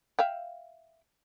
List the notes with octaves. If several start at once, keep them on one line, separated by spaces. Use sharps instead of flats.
E5 F5 G5